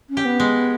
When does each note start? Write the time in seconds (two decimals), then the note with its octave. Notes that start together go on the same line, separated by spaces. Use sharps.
0.09 C#4
0.17 G4
0.25 B3
0.40 G#3